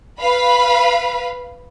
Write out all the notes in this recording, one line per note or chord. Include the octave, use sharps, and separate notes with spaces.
B4 F5 B5